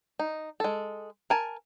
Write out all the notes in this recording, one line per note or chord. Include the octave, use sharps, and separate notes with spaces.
D#4
G#3 A4
A#4 G#5 A5